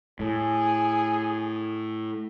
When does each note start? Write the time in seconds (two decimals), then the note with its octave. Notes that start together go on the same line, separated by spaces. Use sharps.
0.20 A2 G#4